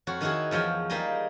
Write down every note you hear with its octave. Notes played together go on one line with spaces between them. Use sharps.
F2 F#4 C#5
D#3 D#4 E4 F#4 G#4
E2 F3 C#5 G5 G#5
G3 A#3 D#4 G#4 D#5